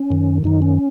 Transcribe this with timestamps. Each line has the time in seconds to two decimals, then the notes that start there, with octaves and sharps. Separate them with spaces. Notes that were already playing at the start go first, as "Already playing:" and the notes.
Already playing: C#4
0.10 F#2 D#3
0.44 F#2 D#3 D#4
0.62 C#4